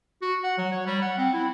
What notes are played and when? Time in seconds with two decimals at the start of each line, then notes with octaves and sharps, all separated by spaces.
0.22 F#4
0.44 F#5
0.58 F#3
0.72 C#5
0.86 G3
1.02 F#5
1.18 C4
1.33 E4